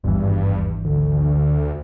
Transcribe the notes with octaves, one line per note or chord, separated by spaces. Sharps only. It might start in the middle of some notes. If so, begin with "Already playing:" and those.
G#1 E2 G2 E3
D2 D3